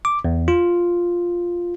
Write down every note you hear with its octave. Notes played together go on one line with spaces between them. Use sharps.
D6
E2
F4